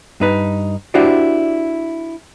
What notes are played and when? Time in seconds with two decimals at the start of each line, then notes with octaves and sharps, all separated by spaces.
0.20 G2 D#4 B4
0.94 D4 E4 F#4 G4 C5 D5